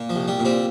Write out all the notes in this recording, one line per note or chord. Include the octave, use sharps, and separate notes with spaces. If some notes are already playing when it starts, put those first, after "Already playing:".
Already playing: A#2
F3
C2
G3
A#2
G3 C4